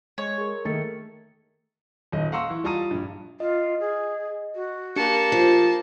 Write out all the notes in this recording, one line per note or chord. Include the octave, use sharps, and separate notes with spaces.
G#3 C#5
G#4 A#4
D#3 A3 A#3 A6 C#7
D#1 D#5
F5 F#5 A#5 C6 C#6 E6
E3
G3 F4 A5 A#5 D#6 D#7
A#1 G2
F4 D#5
G#4
F#4
A#3 D4 G4 A5 C#7
F3 C5